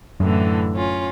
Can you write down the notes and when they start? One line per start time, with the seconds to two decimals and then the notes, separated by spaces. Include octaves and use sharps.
0.20 F#2 A2 D3 E3
0.75 C#4 F4